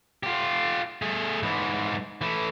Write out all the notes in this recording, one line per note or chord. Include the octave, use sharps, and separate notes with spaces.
F4 G4
A3 G#4
G#2 E3
E3 A3